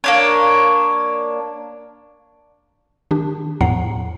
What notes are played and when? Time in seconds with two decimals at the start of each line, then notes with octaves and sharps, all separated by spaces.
0.04 A#3 D4 C#5
3.11 D#3 D4 G4
3.61 E2 A2 F3 F#5 A#5 C7